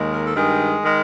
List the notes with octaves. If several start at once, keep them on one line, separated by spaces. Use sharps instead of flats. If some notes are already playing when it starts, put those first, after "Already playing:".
Already playing: D#2 D#3 G#3
A#4
A4
G2 D#3 G#3 G#4
D#3 G#3